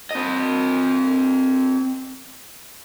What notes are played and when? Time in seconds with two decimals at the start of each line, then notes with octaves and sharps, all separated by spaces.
0.11 C4 D#5